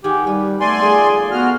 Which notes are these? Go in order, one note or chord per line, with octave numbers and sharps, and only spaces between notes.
D#3 G4 G#4 F#5
G3 B4
A3 B3 D5 G#5 C6
F3 A3 G#4
B3 F#4 F6